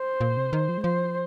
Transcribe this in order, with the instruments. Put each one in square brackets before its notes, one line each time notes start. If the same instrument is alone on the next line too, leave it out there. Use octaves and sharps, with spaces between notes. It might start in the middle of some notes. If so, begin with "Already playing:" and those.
Already playing: [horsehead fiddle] C5
[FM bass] A#2
C3
D#3
F3
G#3
[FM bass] F3 [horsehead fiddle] C5